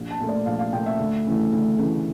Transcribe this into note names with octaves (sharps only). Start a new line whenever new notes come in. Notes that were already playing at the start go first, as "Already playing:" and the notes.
Already playing: A#1
A5
A#2 A3
D5
A#1 F5
F5
A#2 A3 G5
E5
D2
C#3 E3 A3
D2
C#3 E3 A3